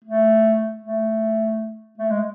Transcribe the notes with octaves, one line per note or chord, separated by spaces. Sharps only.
A3
A3
A3
G#3